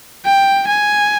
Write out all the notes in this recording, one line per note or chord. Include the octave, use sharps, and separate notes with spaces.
G5
G#5